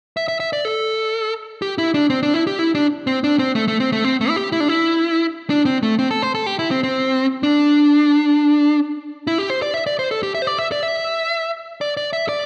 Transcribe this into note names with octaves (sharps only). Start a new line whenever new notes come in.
E5
E5
E5
D5
A4
G4
E4
D4
C4
D4
E4
G4
E4
D4
C4
D4
C4
A3
A3
C4
A3
C4
A3
E4
G4
E4
D4
E4
D4
C4
A3
C4
A4
C5
A4
G4
E4
C4
C4
D4
E4
G4
C5
D5
E5
D5
C5
A4
G4
E5
C5
D5
E5
D5
E5
D5
D5
E5
D5